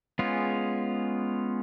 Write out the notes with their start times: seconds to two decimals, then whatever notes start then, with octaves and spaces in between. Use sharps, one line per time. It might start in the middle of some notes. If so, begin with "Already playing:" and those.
0.19 G#3 B3 C#4 F4 G#4